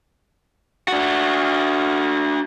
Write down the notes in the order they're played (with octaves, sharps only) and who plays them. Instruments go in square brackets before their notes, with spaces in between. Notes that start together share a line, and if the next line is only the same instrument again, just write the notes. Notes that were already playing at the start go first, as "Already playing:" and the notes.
[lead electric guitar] D4 F#4